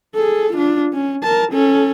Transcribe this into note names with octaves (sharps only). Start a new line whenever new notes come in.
G#4 A4
D4 F4
C#4
A#4 A5
C#4 A4